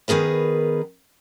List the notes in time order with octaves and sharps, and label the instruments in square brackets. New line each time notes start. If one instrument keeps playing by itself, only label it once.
[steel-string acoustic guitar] D#3 B3 G#4 A#4 B4